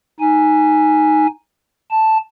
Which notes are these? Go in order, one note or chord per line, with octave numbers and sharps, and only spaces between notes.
D#4 G#5
A5